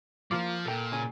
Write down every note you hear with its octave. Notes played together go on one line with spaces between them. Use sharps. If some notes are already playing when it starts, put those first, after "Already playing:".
F3 A#3 F4 D6
A#2 A4 G5
C#3 G#5